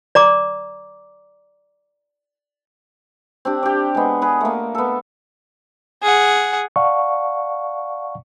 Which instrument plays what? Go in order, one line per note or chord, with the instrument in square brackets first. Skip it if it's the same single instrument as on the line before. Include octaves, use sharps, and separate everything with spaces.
[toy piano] D5 A#5 D6
[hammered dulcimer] C4 D4 G4
G4 D5
G#3 B3
G#4 B4
A3 A#3
B3 A4
[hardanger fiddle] G#4 F#5
[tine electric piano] D5 F5 F#5 A5 C#6